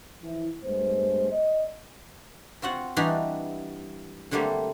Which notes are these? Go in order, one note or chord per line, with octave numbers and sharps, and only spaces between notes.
E3 F3 E4
G2 G#3 A3 B3 C5
D5 D#5
C4 F4 F#4 F#5
E3 G3 D4 D#4 F#4
D3 F#3 G3 A3 A#3 C4